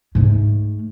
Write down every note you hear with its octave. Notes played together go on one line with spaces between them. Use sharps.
G#2 A3